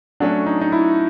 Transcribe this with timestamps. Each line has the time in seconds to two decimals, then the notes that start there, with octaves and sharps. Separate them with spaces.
0.20 F#3 A3 C#4 D4
0.47 D#4
0.62 D#4
0.72 E4